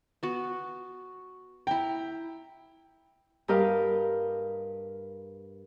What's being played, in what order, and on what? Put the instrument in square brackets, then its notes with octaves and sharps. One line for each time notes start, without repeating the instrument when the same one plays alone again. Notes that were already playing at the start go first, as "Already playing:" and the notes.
[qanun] B3 F#4
[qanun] E4 A#5 [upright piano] G5
[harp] G2 G4 A#4 D#5 F5